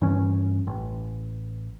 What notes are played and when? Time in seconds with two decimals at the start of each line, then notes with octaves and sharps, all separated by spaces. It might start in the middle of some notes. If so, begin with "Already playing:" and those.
0.01 G2 E3 C#4
0.67 A1